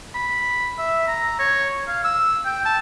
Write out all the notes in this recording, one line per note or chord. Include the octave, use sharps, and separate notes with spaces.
B5
E5
A#5
C#5
F5
E6
G5
A5